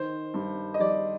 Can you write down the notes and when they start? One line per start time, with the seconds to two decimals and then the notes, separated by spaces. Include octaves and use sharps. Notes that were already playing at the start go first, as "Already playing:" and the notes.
Already playing: D#3 C5
0.34 G2
0.74 D#5
0.80 G3 D5